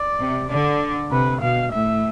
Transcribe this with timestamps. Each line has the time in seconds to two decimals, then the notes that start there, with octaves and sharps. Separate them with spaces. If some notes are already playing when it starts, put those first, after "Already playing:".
Already playing: D5
0.19 C3
0.49 D3 D5
1.11 C3 B4
1.42 B2 F5
1.73 A2 E5